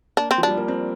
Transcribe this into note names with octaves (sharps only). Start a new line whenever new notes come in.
A#3 D4
C4
F3
G3 D4
A#3
C4